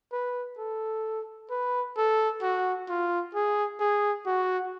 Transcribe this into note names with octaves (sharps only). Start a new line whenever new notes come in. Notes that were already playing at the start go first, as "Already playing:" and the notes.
B4
A4
B4
A4
F#4
F4
G#4
G#4
F#4